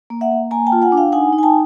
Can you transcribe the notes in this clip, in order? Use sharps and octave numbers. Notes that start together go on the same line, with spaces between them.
A#3
E5 F#5
A#3
A#3 G#5 A#5
G5 A5
F4
F#5 G#5
D4
F5 G5
D#4 F#5 G#5
D#4
G#5
G5 A5